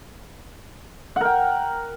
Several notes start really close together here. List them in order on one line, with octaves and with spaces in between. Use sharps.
F#5 A#4 G5